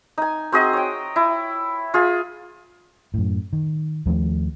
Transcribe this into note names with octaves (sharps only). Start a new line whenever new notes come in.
D#4 G#5
C4 F#4 G#4 D#5
C#5 G5
E4
F4 G#4
F#2 A2
D#3
D#2 F3 A3